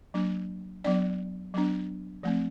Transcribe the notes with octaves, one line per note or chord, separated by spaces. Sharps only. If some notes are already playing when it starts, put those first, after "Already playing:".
F#3 A#3 D4
F#3 B3 D4 D5
F#3 B3 D4
F3 A3 C4